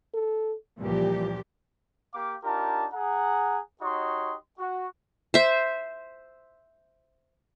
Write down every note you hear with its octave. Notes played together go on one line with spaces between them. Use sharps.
A4
C#2 A#2 E3 F3 G3 G4
A#3 G4 F5 D6
D4 D#4 F4 G4 A#4 A5
G#4 F#5 A#5
D#4 F#4 G4 C#5 D#5 C6
F#4
C5 E5